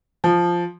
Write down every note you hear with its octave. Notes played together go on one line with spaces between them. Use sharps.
F3